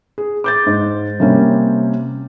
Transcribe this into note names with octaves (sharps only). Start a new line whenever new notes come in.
G#4
D6 G6 A6
G#2
C3 G3 A#3 C#4